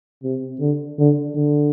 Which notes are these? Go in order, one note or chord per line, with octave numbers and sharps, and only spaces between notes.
C3
D3
D3
D3